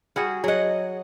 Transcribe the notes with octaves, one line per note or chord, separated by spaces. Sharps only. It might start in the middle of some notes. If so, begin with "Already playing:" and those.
G3 F#4 G#4 F#5
F#3 G#4 D#5 F#5